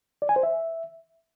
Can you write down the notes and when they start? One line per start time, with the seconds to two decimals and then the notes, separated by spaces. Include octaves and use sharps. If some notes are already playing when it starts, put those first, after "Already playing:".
0.22 D5
0.29 G#5
0.36 C5
0.43 E5